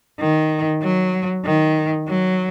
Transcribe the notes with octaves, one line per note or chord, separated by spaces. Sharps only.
D#3
F#3
D#3
F#3